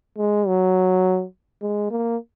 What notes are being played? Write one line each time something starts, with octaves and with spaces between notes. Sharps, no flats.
G#3
F#3
G#3
A#3